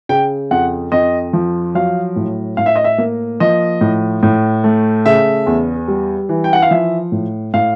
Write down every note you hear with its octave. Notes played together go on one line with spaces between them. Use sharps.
C#3 G5
F2 F#5
F2 D#5
F3
F#3 F5
A2
A2 F5
E5
D#5
E5
A#3
F3 D#5
A2
A2
A3
C#3 E5
E2
G3
E3
G5
F#5
F5
F3 E5
A2
A2 F5